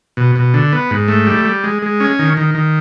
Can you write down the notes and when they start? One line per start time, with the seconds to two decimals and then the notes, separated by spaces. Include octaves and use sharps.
0.17 B2
0.36 B2
0.54 D3
0.73 B3
0.91 G#2
1.08 A3
1.27 G3
1.45 G3
1.64 G#3
1.82 G#3
2.00 C#4
2.19 D#3
2.37 D#3
2.54 D#3